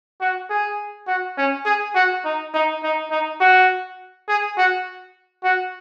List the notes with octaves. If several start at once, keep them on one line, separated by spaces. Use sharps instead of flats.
F#4
G#4
F#4
C#4
G#4
F#4
D#4
D#4
D#4
D#4
F#4
G#4
F#4
F#4